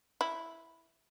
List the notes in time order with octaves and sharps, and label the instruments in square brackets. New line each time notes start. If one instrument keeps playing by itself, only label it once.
[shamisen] E4